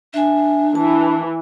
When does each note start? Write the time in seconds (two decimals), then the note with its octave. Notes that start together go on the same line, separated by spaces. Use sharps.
0.14 D4 E5 G#5
0.75 E3 A5